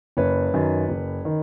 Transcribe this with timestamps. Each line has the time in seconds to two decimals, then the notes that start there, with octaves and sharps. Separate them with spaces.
0.17 F#1 B4 C#5
0.53 F#2 D#3
0.88 F#1
1.25 D#3